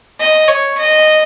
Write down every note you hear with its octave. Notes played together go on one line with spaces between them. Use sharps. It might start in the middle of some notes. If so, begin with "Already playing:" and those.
D#5
C#5
D#5